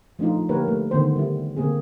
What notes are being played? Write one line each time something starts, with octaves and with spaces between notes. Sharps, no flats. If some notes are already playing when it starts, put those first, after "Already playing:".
F3 A3 D4 D#4 F4
D3 A#3 G4 A#4 B4 C#5
G3 A3
D3 D#3 B3 C5
G3 E4
D3 A#3 C4 G#4